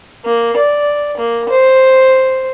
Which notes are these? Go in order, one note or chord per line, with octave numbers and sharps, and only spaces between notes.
A#3
D5
A#3
C5